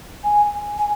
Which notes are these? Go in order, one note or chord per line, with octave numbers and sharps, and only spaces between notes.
G#5
G#5